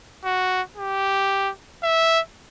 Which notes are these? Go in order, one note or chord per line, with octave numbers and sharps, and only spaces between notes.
F#4
G4
E5